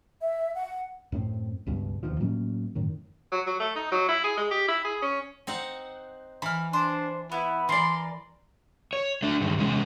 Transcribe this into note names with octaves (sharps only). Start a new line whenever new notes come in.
E5
F#5
F#2 A2 C4
C#2 G2 B2
E1 D#2 D#3 F3
A2 F#3 A#3 C#4
F#2 A2 D#3
F#3
F#3
A3
D#4
F#3
E4
G#4
G#3
G4
E4
G#4
C#4
C4 D#4 F#5
E3 B5 F6
D4 C5
B3 E4 B5
E3 A#4 D5 C6
C#5
A3 D4
G2 D#3
E2 C3 G#3 C#4